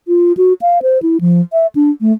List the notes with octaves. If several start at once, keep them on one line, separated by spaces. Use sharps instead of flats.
F4
F#4
F5
C5
E4
F3
E5
D4
A3